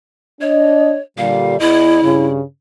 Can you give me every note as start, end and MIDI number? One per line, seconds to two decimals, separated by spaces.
0.41 0.96 62
0.41 1.01 73
0.41 0.96 75
1.18 1.57 46
1.18 1.57 50
1.18 1.57 55
1.18 1.58 77
1.60 2.02 40
1.60 2.25 64
1.60 2.02 75
2.03 2.40 43
2.03 2.40 49